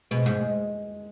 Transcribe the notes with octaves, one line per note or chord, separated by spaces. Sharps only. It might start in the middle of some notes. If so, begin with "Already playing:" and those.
B2 G#3
G#2 G#3
G#3